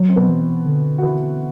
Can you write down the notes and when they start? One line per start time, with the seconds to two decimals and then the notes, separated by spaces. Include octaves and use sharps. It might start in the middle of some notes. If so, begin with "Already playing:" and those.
Already playing: F#3
0.09 C4
0.16 B2 B3
0.28 E3
0.66 D3
0.98 F#4
1.02 E3 E4